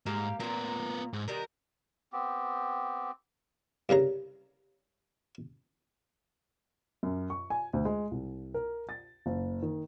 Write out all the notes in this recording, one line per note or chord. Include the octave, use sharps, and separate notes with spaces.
G#2 A#3 G4 F5
A#2 A#3 B3 A#4
G#2
D#3 G3 A#4 B4
B3 C4 G4
C2 G2 C#3 A#5
F#2
C#6
G#5
D2
G#3
C2
A#4
A6
F#1
D#3